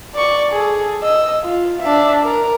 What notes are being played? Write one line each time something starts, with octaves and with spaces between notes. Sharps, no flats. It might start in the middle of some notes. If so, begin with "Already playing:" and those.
D5 C#6
G#4 A4
D#5 E6
F4
D4 E5
A#4